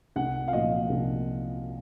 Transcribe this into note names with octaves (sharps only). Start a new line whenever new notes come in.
C2 F#5
F5
A#2 F3 D#5
C2